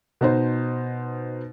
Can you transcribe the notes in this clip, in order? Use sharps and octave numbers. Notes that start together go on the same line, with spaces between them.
B2 D#4 C5